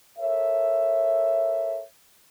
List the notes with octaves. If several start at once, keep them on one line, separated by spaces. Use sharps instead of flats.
A4 A#4 C#5 E5